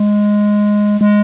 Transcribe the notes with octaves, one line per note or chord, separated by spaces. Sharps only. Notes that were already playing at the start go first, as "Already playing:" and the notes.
Already playing: G#3
G#3